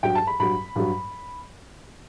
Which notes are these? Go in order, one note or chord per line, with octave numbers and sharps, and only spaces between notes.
G2 F#3 G5
A5
B5
G2 F#3 B5
G2 F#3